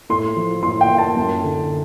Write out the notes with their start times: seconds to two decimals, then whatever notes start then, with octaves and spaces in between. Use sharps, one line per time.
0.10 A2 C6
0.37 F3
0.63 A2 C6
0.81 G5
0.90 A#3
0.98 A5
1.17 F#2
1.43 D3